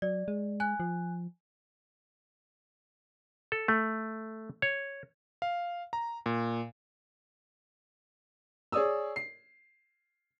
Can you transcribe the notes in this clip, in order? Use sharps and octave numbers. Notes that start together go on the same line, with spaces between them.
F#3 D5
G#3
G#5 F#6
F3
A4
A3
C#5
F5
A#5
A#2
G#4 C#5 D5 D#6 E6
C7